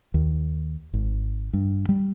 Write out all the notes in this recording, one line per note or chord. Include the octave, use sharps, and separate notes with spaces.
D#2
G#1
G2
G3